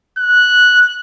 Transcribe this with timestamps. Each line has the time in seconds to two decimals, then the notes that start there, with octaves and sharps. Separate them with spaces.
0.18 F#6